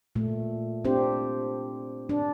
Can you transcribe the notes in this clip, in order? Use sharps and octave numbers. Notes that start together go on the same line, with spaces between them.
A#2 A3
C4 D4 G4 C5
D4